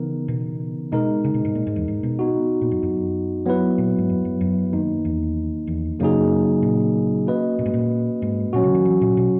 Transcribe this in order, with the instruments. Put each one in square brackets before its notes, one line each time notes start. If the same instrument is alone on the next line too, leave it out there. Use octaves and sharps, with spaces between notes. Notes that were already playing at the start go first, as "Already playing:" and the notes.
Already playing: [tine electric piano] C#3 E3 B3 D#4 A#4
[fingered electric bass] B2
[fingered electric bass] B2 [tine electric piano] G#3 D#4 A#4
[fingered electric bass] C#3
B2
G#2
A#2
G#2
E2
G#2
B2
[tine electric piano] B3 D#4 F#4
[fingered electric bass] A#2
F#2
F#2
[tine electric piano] F#3 B3 E4 B4
[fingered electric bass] A#2
G#2
F#2
F#2
F#2
[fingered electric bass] F#2 [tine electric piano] D#3 A#3 D#4
[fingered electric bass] E2
E2
[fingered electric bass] F#2 [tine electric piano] C#3 F#3 A#3 D#4 G#4
[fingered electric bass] A#2
[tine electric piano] A#3 C#4 F#4 B4 D#5
[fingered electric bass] A#2
G#2
A#2
G#2
[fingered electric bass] A#2 [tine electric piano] F#3 C#4 F#4
[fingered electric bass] C#3
D#3
E3
A#2
B2